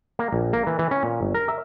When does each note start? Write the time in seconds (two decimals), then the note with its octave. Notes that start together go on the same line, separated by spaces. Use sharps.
0.19 A#3
0.33 A#1
0.53 A#3
0.67 E3
0.79 E3
0.91 C#4
1.03 A#2
1.21 G1
1.34 A#4
1.48 E5